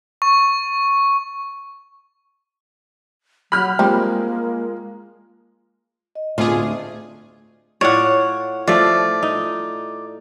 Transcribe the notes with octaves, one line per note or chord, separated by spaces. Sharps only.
C#6
F#3 B5 F6 F#6
F3 G3 G#3 A#3 C4
D#5
D2 A2 B3 C4 F4 G#4
A2 F4 C#5 D5 F#5
F3 A3 F4 D5
D#4